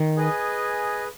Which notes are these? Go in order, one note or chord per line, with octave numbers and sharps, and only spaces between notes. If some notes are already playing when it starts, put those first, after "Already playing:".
Already playing: D#3
G#4 B4 D#5 G#5